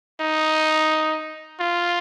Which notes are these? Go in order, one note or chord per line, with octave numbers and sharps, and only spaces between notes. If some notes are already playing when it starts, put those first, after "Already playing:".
D#4
F4